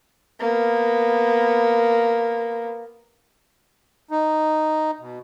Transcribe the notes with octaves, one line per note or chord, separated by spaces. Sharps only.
A#3 B3
D#4
B2